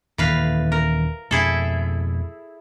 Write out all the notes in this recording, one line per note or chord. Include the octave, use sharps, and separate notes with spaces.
D#1 D#2 A2 E3 B4 F5
A#4
F2 B2 E4 G#4 A4